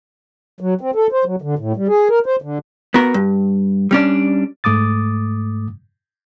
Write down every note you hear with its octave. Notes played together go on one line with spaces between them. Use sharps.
F#3
C4
A4
C5
F#3
D3
A2
G3
G#4
A#4
C5
D3
B3 F#4 A#4
G2
G3 C#4 D4
G#2 A3 D6 D#6 A6